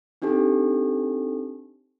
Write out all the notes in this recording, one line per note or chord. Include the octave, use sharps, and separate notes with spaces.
C4 D4 D#4 G4 A4